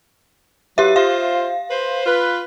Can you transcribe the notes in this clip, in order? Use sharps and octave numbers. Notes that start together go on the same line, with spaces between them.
F#3 E4 G4 B4 E5
F4 C5 F5
B4 C5
F4 B4